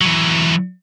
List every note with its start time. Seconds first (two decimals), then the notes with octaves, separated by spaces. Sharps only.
0.01 E3 F#3